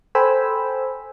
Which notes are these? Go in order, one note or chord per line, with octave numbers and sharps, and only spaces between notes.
A4 C5 G5 G#5 B5 E6